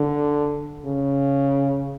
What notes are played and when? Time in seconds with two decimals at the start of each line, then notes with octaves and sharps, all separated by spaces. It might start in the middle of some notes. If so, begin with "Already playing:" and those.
Already playing: D3
0.86 C#3